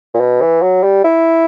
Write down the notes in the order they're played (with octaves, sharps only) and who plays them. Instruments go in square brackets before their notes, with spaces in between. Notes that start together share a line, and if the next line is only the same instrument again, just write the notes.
[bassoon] A#2
B2
E3
F#3
G3
E4